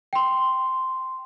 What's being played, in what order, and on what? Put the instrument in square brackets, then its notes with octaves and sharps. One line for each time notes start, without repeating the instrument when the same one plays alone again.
[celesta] G5 C6